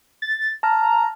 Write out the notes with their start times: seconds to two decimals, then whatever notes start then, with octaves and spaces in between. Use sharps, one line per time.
0.22 A6
0.63 A5 A#5 F6